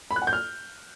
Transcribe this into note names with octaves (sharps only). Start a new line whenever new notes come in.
B5
F#6
F#5
G6
F6